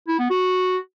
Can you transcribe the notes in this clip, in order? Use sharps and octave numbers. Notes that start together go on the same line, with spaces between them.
E4
B3
F#4